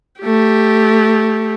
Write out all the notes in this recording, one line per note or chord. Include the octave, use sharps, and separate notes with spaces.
A3 G4